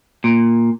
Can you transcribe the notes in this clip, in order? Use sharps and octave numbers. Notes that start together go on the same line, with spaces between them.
A#2